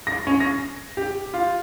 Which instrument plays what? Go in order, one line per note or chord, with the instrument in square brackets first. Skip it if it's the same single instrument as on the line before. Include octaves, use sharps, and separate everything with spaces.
[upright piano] A#6
C#4
A#6
G4
F4